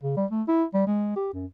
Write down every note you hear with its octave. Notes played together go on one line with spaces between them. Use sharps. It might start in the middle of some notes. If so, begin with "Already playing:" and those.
C#3
G3
A3
E4
G3
G#3
G4
F#2